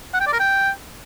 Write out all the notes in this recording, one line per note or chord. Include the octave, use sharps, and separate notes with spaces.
F#5
G5
D5
A#4
G5